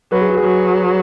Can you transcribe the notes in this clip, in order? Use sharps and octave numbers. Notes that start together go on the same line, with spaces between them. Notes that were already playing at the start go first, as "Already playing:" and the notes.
F#3 B4
G#4
F#4
G#4
F#3